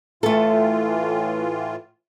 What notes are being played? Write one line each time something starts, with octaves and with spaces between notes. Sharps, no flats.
A2 E3 A3 F4 A4